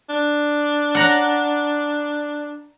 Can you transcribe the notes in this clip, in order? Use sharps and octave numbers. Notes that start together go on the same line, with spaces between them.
D4
F#5 A#5